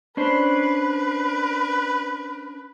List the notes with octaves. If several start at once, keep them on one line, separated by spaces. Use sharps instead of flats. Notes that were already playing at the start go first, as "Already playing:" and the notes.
C#4 D4 B4 C5